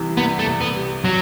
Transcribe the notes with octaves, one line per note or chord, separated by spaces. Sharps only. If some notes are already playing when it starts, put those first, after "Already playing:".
Already playing: C2 C3 E3
C2 B3
A3
C2
B3
C3
F#3 F#4